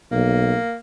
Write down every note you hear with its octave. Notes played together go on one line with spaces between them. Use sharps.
B1 A#3